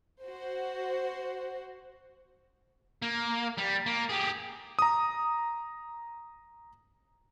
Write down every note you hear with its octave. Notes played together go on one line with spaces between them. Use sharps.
F#4 C5
A#3
G3
A#3
G4 G#4
A#5 D#6